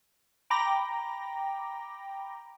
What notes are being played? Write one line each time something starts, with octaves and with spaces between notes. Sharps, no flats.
G5 A#5 B5 D6 A#6